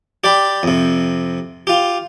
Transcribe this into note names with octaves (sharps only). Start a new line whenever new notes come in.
G4 D5 G5 B5
F2 C3
F4 G4